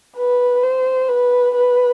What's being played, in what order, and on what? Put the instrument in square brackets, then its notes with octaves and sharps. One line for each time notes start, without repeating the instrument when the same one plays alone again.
[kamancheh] B4
C5
B4
B4